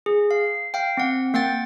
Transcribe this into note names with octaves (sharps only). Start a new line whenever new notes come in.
G#4
F5
F5 G5
C4 F#5
A#3 F#5 G5 A6